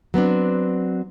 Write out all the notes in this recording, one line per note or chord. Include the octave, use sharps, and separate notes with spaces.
F#3 B3 C4 D4